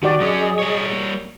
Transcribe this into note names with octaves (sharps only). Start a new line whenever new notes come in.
D#3 F#4 G4 D5
F#3 C#4 G#4 D#5
G3 C#5
A#3